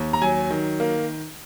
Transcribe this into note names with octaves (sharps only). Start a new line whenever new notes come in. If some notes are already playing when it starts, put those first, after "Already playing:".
Already playing: D#2
A#5
F#3 G#5
D#3
A#3